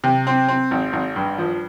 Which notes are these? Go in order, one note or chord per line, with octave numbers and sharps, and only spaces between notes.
C3
C4
C4
G#1
G#1
G2
F3